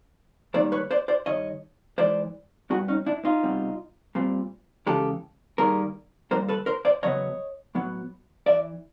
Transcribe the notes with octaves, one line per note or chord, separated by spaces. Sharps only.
G#2 D#3 G3 A#3 C5 D5
B4 C#5
C5 D5
C5 D5
G2 D#3 C#5 D#5
G#2 E3 G#3 C5 D5
A#2 G3 B3 F#4 G#4
C#4 D#4
D4 E4
D#4 F4
C2 B2 G3 C4
A#2 G3 C4
E2 C#3 E3 G#3 G4 A4
G2 D#3 G3 A#3 G#4 A#4
D#2 D#3 G3 A#3 A#4 C5
A4 B4
A#4 C5
C5 D5
E2 C#3 F#3 B3 C#5 D#5
A2 F#3 B3
E2 C3 E3 D5 E5